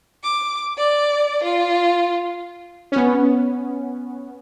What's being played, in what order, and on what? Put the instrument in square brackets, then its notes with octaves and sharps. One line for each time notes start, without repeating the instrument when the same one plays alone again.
[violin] D6
D5
F4
[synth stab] B3 C#4